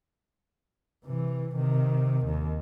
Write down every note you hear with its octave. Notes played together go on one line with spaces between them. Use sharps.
C3 E3
C3 D#3
D#2